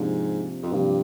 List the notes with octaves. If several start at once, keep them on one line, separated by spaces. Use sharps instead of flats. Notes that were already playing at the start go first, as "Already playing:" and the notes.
Already playing: G#2 C3 F3 A#3 D4 G4
F2
G2 C3 F3 A#3 D4 G4